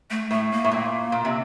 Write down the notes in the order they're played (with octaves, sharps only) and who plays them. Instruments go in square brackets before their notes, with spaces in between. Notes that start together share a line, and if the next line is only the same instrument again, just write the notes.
[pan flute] A3
[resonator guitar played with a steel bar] A2 [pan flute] A3
[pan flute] A#3
[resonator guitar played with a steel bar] A2
A#2
A#2
C3